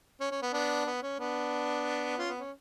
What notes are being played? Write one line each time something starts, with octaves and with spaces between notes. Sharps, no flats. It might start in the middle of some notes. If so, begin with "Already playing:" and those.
C#4
C#4
B3
B3 D4
B3
C#4
B3 D4
C#4 F4
B3
C#4